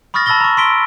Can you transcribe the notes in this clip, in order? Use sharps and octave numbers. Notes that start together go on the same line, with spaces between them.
B5 C#6 D#6 F6 A6 A#6
A5 B5 E6 A6 A#6 G7
A#5 C#6
C6 E6 B6 D7 G7